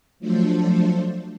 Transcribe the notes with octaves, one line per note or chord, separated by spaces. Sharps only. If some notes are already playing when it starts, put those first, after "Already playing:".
F3 F#3 A3 D4 A4 C5